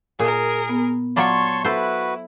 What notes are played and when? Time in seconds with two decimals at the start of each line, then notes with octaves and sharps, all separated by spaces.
0.19 A#2 G#4 A#4
0.69 B3
1.17 F#3 F4 C#5 D5 A5 C6 C#6
1.64 E4 F#4 A4 B4 C5